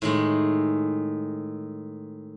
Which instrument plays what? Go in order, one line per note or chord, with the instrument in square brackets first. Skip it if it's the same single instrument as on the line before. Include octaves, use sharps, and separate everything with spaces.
[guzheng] A2 D#3 G#3